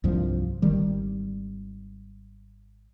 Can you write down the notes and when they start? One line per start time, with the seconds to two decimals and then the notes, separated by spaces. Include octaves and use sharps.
0.04 C2 G2 F3 F#3
0.62 G#1 D#3 G3